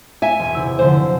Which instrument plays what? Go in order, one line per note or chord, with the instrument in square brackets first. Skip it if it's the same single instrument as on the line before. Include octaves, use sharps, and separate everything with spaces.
[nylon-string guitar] E5 G#5
[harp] E1
C3 E4 E6
[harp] F#2 D3 F3 [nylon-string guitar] C5